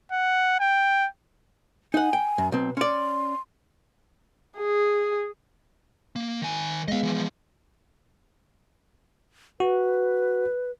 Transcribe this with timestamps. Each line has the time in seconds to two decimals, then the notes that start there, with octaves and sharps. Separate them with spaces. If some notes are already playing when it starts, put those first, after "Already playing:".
0.11 F#5
0.60 G5
1.94 D#4 F#5 G#5
2.13 G5
2.38 F#2
2.52 B1 C4 B4
2.77 C#4 D5 C6
4.57 G#4
6.16 A#3
6.42 D#3 G#5
6.88 G#3 B3 D#5 F5
7.03 E3 F3
9.60 F#4 B4